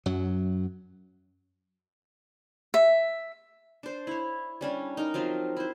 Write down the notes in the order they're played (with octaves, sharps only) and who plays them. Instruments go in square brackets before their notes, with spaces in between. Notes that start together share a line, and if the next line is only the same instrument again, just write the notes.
[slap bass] F#2 F#3
[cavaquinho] E5
[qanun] D4 C5
E4 C#5
G3 C#4 D4
D#4 A#4
F3 F#3 C4 F4
E4 C5